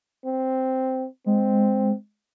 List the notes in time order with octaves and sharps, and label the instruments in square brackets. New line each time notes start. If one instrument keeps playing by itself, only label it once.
[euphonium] C4
[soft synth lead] G#3 [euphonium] C4